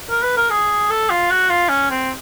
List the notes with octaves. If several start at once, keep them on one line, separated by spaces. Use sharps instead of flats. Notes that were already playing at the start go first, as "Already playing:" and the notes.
A#4
B4
A#4
G#4
A4
F4
F#4
F4
C#4
C4